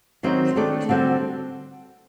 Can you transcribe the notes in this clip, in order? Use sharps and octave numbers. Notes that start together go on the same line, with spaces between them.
D#3 F#3 C4 D#4
D#3 A3 D4 A4 D5
D3 G3 C4 F#4 A4